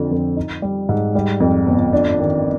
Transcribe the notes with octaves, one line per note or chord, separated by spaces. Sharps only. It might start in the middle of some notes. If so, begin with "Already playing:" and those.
Already playing: F2 D3 C4
F2
D#4
G3
G#2
G3
F2
G1
D4
D#3